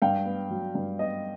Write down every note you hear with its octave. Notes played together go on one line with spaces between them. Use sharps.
G2 F5 G5
B3
F#3
G2
B3 D#5